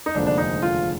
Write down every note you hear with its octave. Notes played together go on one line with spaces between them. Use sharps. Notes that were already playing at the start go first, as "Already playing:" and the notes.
D#4
F1 D#2 D3 F3 G#3 D4
D4
D#4
F4